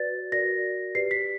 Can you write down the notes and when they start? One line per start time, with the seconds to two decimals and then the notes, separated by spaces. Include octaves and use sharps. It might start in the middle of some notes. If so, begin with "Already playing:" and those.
Already playing: F#4 B4 D5 A6
0.32 F#4 A#4 D5 A#6
0.95 G4 B4 D5 C7
1.11 B6